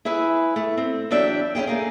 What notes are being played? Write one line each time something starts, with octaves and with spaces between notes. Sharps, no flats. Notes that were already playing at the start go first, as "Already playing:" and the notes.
E4 G#4 B4 E5
A3
C4
E2 F#3 D4 E5 G5
C#4 F4 G#4 G5
A3 A#3 G#4